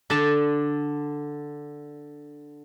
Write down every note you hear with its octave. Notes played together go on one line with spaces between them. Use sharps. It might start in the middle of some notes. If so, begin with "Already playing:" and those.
D3 D5 A5